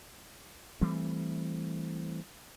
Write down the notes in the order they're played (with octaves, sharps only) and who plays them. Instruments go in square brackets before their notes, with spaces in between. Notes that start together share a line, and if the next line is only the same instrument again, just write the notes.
[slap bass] E3 G3 A3 C4